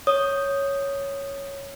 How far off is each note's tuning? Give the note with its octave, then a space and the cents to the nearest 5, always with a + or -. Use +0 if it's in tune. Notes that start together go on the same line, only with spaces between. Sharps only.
C#5 +0 D#6 -10